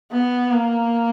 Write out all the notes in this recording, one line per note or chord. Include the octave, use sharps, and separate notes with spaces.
B3
A#3